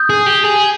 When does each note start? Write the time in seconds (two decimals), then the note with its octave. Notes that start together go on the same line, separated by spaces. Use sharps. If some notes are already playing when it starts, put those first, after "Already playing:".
Already playing: D#6 G6
0.10 G#4
0.26 G4
0.44 G#4